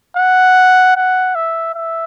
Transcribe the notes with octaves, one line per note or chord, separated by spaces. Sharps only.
F#5
F#5
E5
E5